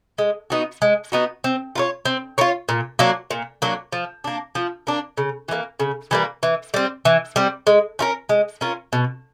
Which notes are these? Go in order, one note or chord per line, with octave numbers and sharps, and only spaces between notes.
G#3
B3 D#4 F#4
G#3
B3 D#4 F#4
C4
F4 A#4 C#5
C4
F4 A#4 C#5
A#2
F#3 A#3 D4
A#2
F#3 A#3 D4
F3
A#3 D4
F3
A#3 D4
C#3
E3 G3 A#3
C#3
E3 G3 A#3
E3
G3 C4
E3
G3 C4
G#3
C#4 F4 A#4
G#3
C#4 F4 A#4
B2